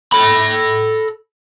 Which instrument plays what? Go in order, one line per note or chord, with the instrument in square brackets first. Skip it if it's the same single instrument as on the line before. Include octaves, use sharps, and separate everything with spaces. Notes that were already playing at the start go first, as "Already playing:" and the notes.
[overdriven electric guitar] A4 B5